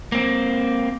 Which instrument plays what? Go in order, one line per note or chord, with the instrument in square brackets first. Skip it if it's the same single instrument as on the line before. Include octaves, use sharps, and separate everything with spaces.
[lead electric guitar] A#3 C4